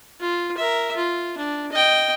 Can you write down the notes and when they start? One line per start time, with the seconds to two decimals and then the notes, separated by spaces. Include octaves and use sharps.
0.20 F4
0.57 A#4 E5
0.97 F4
1.38 D4
1.72 D#5 G5